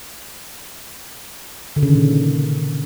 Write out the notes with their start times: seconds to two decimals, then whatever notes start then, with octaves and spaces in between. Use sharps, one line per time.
1.76 D3
1.83 C#3
1.89 D#3
1.95 A#2